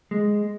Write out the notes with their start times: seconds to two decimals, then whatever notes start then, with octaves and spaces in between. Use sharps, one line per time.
0.11 G#3